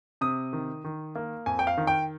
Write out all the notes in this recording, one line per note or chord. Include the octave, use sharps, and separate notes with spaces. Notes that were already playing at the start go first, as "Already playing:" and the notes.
C3 D#6
D#3
D#3
A#3
F2 G#5
G5
F5
D#3
G5